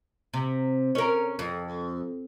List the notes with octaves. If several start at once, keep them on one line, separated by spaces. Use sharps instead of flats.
C3
C#4 A#4
F2